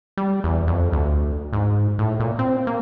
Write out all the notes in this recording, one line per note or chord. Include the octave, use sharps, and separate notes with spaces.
G3
E2
F2
D2
G#2
A2
A#2
C4
A#3